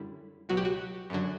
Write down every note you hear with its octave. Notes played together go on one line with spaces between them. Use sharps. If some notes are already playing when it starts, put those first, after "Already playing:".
Already playing: F#2 D3 G3 E4
C#2 B2 F#3 F#4
G4
F#4
F#2 D3 F#3